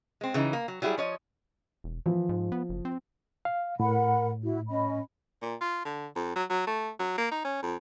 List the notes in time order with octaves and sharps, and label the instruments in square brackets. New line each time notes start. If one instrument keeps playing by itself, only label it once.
[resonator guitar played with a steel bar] G#3 C4
C#3 E3 D#4
A#3
F#3
F#3 G3 E4 F#4 G#4
F3 C#5 D#5
[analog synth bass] E1
[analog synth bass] E3 [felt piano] F3
[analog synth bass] G#2
B3
F#1
C4
[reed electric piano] F5
[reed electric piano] A2 [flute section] A#4 F#5 B5
[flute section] E4 F#4
C#4 D#5 B5
[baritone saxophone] A#2
F4
D3
F2
F#3
F#3
A3
F#3
A#3
D#4
C#4
F2